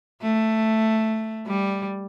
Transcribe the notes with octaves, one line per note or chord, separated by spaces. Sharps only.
A3
G3